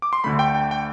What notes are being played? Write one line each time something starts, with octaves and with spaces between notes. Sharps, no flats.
D6
C6
D2 D3 A3 B5
G5
G5
G5